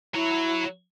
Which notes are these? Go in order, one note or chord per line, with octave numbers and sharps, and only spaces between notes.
F#3 E4 C#5